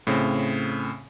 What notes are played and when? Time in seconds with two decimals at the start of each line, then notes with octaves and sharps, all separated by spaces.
0.07 A2 C#3 C4